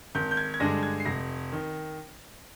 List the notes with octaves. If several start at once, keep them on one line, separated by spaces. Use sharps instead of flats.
G#1 G6
G6
G#6
G#6
G2 D3 G#3 D4 A#6
G#6
C7
F1 A#6
D#3